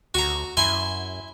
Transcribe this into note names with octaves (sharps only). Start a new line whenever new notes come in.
D2 F#4 A#5
F#2 E4 G#5 C6